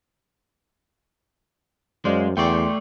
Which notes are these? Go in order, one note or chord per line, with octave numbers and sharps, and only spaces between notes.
F#2 G#3 C5 D5 F5
E2 A3 D5 G5 C6 C#6